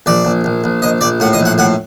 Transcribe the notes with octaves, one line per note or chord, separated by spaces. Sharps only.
A#1 D5
A#1
A#1
A#1
A#1 D#5
A#1 D5
A2 F#5
D#5
A#1
F#5
A2 F#5